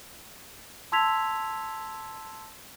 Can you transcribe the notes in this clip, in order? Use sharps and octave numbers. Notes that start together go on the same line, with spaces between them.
A5 C6 E6 G#6 B6 F7